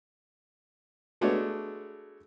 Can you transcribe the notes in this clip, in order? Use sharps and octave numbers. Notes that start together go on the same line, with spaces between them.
G#3 A3 B3 D4 F#4 C#5